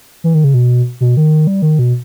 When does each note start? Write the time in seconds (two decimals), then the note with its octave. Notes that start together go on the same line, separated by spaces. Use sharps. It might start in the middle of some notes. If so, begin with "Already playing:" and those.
0.24 E3
0.34 D#3
0.44 C#3
0.54 B2
1.01 B2
1.17 D#3
1.47 G3
1.62 D#3
1.79 B2